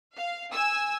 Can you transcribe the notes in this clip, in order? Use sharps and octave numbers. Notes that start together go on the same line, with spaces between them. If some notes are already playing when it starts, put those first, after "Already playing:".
F5
G#5 E6